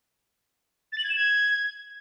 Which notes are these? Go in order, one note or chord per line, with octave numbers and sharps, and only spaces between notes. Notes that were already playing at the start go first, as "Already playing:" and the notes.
A6
F#7
G#6
E7
G#6